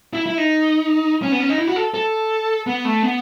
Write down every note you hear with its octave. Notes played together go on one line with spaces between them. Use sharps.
E4
E4
D#4
C#4
B3
C#4
D#4
E4
F#4
A4
A4
B3
A3
B3